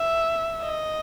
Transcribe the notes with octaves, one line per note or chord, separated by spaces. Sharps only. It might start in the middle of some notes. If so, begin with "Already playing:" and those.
Already playing: E5
D#5